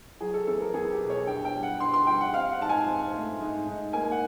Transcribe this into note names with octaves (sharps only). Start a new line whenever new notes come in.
F#3 G#4
A4
E2 A4
A#4
E2 G#4
G4
B2
C#5
G2 G5
G5
G3
F#5
G2 C6
C6
G3 G5
F#5
C4 F5
F#5
G#2 A5
G#5
C4
A3
G#2
G#2
A#3 G#5
F#5